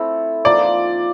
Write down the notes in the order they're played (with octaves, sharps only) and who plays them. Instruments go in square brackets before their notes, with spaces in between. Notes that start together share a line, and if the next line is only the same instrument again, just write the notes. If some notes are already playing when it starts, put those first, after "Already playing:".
Already playing: [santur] A3 C4 E4 A4
[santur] F3 A#3 D#4 [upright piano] D5